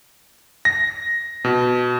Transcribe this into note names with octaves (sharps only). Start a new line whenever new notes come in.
A#6
B2